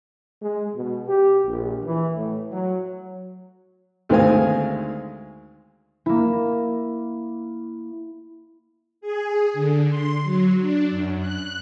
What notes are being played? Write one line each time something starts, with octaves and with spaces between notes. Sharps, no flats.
G#3
B2
G4
A#1
E3
A2
F#3
D2 D#3 G#3 C4 F5 G#5
A#3 E4
G#4
D3
C6
F#3
D4
F#2
F#6